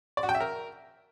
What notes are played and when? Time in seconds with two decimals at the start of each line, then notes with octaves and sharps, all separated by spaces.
0.17 D5
0.23 F#4
0.29 G5
0.35 E5
0.40 A#4